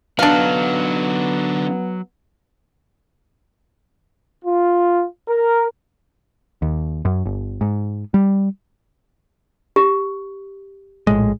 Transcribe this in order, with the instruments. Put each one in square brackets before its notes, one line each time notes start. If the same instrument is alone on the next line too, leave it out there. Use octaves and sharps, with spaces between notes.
[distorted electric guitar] D3 D#4 [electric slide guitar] F#3 [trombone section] B3 [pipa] D4 F5
[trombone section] F4
A#4
[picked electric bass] D#2
F#2
G1
G#2
G3
[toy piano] G4
[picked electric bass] A#1 A2 G#3